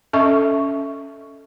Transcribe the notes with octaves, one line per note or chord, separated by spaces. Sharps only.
C#4 A4 D#5 E5 C#6